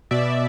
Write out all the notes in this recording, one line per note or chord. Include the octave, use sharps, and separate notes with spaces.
B2 D5 E5